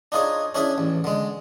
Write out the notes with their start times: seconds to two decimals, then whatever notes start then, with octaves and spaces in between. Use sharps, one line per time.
0.12 D4 D#4 F4 G#4 C#5
0.55 C#4 D4 E4 G#4 C#5
0.78 A1
1.04 D3 G#3